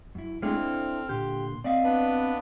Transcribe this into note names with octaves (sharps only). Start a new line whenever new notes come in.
F#2 E4
G#3 A3 C4 D4 E4 G#4 C5 F6
A4
A#2 D3 G4 C6
C4 D5 D#5 F5
B3 D4 B4